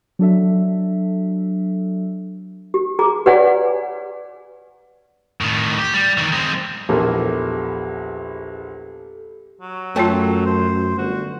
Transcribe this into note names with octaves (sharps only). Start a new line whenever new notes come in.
F#3 D4 A4 E5
G4
G#4 A#5 D6
G4 B4 C#5 D5 F#5 G#5
A2 D#3
G4
G3
D#3 E3
G#3 C4
A#1 E2 G4 A4 A#4
F#3
F#2 A3 F4 A4 C#5 G5 A5
C5
G1 F#4